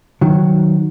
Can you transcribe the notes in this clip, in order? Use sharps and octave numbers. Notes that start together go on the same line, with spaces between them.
D#3 F#3